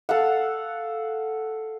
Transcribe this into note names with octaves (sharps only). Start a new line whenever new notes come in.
A4 F5 F#5